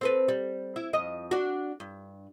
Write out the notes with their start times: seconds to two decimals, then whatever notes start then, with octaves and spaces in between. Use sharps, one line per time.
0.01 C4 A4 B4
0.28 G3
0.76 E4
0.93 F2 D#5
1.31 D4 F#4
1.80 G2